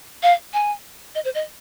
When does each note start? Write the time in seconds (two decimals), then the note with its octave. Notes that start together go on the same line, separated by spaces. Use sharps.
0.23 F5
0.53 G#5
1.15 D#5
1.25 C5
1.35 D#5